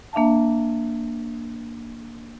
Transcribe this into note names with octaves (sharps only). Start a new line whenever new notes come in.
A#3 D4 E5 F5 A5